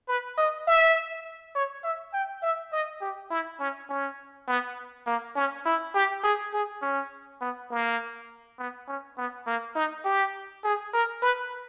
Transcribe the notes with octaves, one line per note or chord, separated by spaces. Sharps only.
B4
D#5
E5
C#5
E5
G5
E5
D#5
G4
E4
C#4
C#4
B3
A#3
C#4
E4
G4
G#4
G#4
C#4
B3
A#3
B3
C#4
B3
A#3
D#4
G4
G#4
A#4
B4